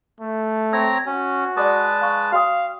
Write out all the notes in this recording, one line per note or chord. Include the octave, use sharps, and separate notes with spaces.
A3
C4 C#5 A#5 E6
C#4 F#4
G#3 B4 D5 A5 D6 D#6
F5 C#6
F#4 F5 G5 D#6